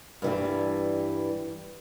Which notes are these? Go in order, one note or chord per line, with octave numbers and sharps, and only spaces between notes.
G2 E3 G3